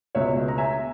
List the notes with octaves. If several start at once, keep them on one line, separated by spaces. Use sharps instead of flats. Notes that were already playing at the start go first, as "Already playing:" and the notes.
C#2 B2 C#5 E5
A#5
E5 G#5